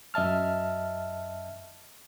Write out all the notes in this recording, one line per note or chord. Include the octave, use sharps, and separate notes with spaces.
F#2 D#5 E5 A5 F6